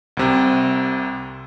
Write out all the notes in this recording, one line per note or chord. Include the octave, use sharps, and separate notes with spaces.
C2 C3